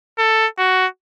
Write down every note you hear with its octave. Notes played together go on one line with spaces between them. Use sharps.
A4
F#4